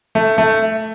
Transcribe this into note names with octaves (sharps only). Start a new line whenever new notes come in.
A3
A3